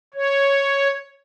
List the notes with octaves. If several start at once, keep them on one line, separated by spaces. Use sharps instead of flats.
C#5